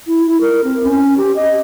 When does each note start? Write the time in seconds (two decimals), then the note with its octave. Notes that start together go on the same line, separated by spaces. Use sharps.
0.07 E4
0.27 E4
0.41 A#4
0.64 C4
0.83 C#4
1.17 G4
1.36 D#5